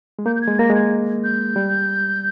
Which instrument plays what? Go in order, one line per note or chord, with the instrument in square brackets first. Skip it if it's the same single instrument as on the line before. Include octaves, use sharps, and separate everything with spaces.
[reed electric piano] G#3
[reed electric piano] A#3 [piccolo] G6
[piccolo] G6
G#6
[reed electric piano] G#3
[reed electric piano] A#3 [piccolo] A#6
[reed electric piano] G#3
[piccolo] G#6
G6
[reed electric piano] G3